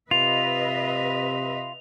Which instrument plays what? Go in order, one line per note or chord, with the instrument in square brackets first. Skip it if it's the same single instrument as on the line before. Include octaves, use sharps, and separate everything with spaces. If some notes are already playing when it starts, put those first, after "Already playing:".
[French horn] C3 [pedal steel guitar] F4 [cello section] B4 D#5 E5 [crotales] F7